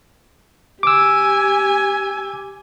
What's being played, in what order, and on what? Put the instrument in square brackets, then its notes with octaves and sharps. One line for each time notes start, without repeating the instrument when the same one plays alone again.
[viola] G4 G#5 [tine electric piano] D6 E6